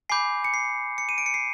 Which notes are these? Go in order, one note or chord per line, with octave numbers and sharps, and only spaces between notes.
G#5 B5 D6 G6 C7
C#7
C7
C#7
D#7
D7
C#7
C7